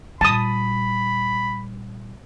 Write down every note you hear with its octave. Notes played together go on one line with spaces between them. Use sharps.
A#2 G3 A5 B5 D#6